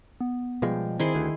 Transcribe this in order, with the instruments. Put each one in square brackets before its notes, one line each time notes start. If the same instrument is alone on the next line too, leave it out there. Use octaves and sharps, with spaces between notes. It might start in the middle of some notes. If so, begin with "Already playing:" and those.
[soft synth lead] B3
[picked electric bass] B2 F3 G#3 [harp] G3 G5
[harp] D#3 [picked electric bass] C4 [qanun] E4 G#4 C6
[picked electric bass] D2